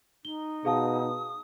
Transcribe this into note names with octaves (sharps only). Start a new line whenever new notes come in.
D#4 G7
B2 G#4 F5 A5 D#6